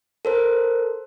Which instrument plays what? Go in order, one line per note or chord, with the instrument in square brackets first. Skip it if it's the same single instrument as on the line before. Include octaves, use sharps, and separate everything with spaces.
[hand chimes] A4 A#4 C5